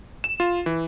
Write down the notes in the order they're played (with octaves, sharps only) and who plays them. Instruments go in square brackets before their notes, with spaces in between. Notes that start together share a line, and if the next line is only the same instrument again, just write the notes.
[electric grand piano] E7
F4
E3